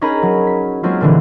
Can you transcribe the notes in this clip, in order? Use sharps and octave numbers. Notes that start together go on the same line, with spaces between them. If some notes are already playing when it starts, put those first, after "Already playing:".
C#4 D#4 G#4 A#4 A#5 B5
F#3
B6
F#3 G#3 A#3 C4 C#4 F4
A#2 D3 E3